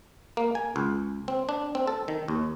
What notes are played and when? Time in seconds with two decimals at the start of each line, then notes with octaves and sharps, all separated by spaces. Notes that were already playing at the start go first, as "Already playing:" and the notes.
0.37 A#3
0.55 G#5
0.76 C#2
1.28 C4
1.49 D4
1.75 C4
1.87 A4
2.08 D#3
2.28 D#2